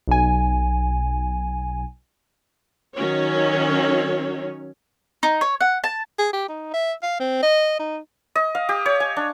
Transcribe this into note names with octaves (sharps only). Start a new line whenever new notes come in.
B1 G#5
D#3 F#3 C#4 C#5
D#4
C#5
F#5
A5
G#4
G4
D#4
E5
F5
C4
D#5
D#4
D#5
F5
G4
C#5
G#5
D4